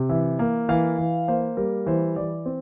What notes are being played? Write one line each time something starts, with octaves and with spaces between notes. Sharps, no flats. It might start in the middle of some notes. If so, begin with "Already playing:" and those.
Already playing: C3
E3 E5
A#3
E3 F5
E3
A#3 C5
G3 A#4
E3 C5
E3 D5
C4